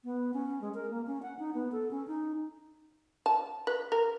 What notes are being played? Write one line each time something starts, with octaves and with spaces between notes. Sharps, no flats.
B3
C#4
G#3
A#4
A#3
C#4
F#5
D#4
B3
A4
C#4
D#4
A5
B4
A#4